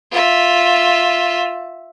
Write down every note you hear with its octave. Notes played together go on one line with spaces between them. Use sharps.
F4 E5